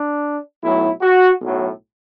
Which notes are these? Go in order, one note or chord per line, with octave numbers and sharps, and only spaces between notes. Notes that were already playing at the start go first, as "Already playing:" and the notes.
Already playing: D4
B1 A2 F#3 E4
F#4
B1 A2 F#3